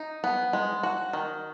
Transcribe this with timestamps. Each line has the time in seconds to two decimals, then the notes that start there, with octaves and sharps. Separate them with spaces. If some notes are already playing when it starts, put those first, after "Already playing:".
Already playing: D#4
0.24 B3
0.53 G#3
0.83 F#4
1.13 D#3